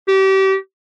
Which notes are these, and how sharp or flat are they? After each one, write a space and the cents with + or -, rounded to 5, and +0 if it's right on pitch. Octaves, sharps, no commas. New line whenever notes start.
G4 -30